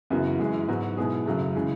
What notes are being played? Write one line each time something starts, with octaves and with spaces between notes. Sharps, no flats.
F#2 C#3 E3 B3 F#4
F#2 E3 G#3
G#2 F#3 B3 F#4
B2 G#3 B3 E4 G#4
F#2 C#3 F#3 A3
C#3 E3 G#3